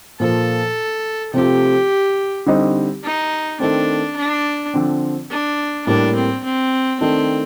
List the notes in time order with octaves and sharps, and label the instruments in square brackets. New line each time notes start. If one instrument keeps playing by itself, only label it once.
[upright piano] A#2 F3 A#3 F4 [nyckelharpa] A4
[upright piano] C3 F3 A3 C4 F4 [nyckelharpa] G4
[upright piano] D3 G3 C4 D#4
[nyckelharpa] D#4
[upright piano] D#3 A3 C4 [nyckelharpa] D4
[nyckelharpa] D4
[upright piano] D3 F3 C4
[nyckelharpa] D4
[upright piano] A2 G3 A#3 [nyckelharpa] D4
[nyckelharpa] C4
C4
[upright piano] D#3 A3 D4 [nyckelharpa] C4